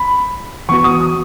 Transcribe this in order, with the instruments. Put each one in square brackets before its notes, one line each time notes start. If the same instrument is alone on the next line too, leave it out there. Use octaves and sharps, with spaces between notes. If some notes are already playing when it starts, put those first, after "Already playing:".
Already playing: [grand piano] B5
[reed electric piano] E3 B3 F#4 [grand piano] C#6
[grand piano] D#6
D#6